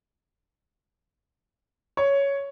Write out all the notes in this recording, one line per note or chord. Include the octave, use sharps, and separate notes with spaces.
C#5